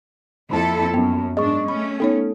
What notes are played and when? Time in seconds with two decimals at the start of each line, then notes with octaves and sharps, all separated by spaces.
0.51 F2 A#3 E4 A4 A5 B5
0.94 F#2 B3
1.37 G#2 D4 G#4 D#5 C#6
1.68 A3 C#4 B5
2.00 B3 D#4 A4 C#5